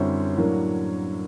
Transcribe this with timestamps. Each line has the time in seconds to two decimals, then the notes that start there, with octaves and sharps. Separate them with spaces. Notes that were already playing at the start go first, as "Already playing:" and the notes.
Already playing: F#2 D3 G3 C4 E4 C5 C#5
0.36 A2 F#3 A#3 D4